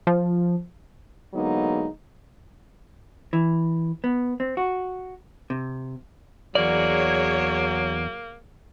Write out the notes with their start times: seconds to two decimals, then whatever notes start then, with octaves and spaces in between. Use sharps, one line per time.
0.07 F3
1.33 D3 F#3 G#3 A#3 B3 D#4
3.33 E3
4.04 B3
4.40 C4
4.57 F#4
5.50 C3
6.55 E2 F#3 A#3 G#4 C#5 D5